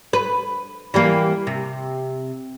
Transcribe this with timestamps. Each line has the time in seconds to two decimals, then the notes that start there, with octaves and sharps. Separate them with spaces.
0.13 B4
0.94 E3 G3 A#3
1.47 C3